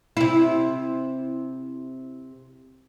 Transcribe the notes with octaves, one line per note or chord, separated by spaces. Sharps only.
C3 E4